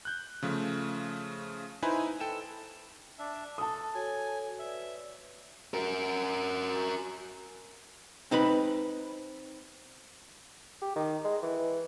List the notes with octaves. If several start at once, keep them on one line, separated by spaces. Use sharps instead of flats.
F#6 G6
C#3 F3 A3
D#4 E4 B4 C5 G#5 B5
A4 G5 E7
D4 E5
A4 A5 D#6
F#4 A4 C#5 G#5
B4 D5 E5
F#4 A#4
C4 D#4 B4 B5
G4
D#3
G#3
E3